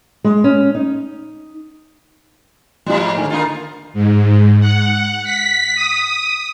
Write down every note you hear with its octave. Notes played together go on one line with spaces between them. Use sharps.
G#3
C#4
D#4
A2 F3 G3 F4
G#2
D3 D#3 G#5
A#3 D#4 F4
G#2
F#5
B6
D#6